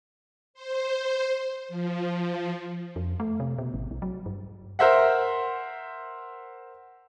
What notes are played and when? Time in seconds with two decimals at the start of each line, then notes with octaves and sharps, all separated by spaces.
0.54 C5
1.68 F3
2.96 F2
3.20 A3
3.40 C3
3.58 B2
3.74 G#1
3.91 B1
4.02 F#3
4.26 G2
4.79 A#4 C5 E5 F#5